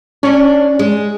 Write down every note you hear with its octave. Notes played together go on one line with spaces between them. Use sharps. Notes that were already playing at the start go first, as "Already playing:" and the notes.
C#4 D4
G#3